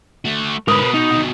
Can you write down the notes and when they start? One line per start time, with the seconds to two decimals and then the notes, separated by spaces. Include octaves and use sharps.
0.25 A3 F#4
0.68 G#2 D3 A#4 B4 D#6
0.81 B2
0.94 D#4
1.11 D2 B2